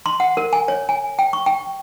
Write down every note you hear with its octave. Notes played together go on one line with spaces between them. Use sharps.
C6
F#5
A#4
G#5
C#5
G#5
G5
C#6
G5